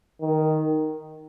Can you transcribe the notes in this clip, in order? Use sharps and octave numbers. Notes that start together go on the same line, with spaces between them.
D#3